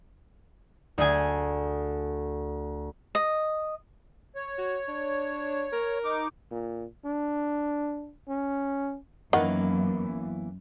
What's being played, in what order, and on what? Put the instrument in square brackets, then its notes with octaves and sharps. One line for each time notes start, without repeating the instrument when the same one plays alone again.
[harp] D2 A3 G#4 G#5
[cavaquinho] D#5
[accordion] C#5
[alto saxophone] F#4
D4
A#4
[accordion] D#4 D6
[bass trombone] A#2
D4
C#4
[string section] F#2 [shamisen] D#3 F#5 [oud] E3 A#3 B3